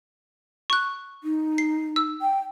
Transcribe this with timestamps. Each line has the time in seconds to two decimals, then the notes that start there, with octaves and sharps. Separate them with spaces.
0.70 C#6 F#6
1.24 D#4
1.58 C7
1.96 E6
2.22 G5